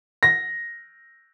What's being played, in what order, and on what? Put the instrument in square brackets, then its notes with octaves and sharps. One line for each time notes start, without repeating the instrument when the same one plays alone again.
[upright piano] A#6